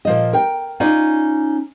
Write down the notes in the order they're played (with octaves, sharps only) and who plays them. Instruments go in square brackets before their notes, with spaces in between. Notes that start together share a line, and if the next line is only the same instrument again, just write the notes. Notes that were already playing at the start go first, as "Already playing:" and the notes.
[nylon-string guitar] A#2 F3 D#5
A#4 G5
C#4 D#4 F4 D5